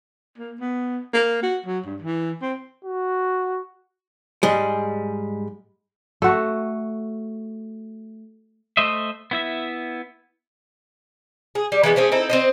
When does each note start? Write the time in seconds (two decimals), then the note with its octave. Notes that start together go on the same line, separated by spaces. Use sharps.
0.38 A#3
0.60 B3
1.13 A#3
1.43 F#4
1.66 F#3
1.86 G2
2.02 E3
2.41 C4
2.85 F#4
4.43 G#2 G3 G#3
6.22 A3 F#4
8.77 A3 C5 D#5 E5
9.31 B3 E4 E5
11.55 G#4
11.72 G3
11.83 E3 G#3 B3 F#4
11.96 A3 C4 C#4 G#4
12.12 C4 D#4 E4 A4
12.30 C4 C5 D#5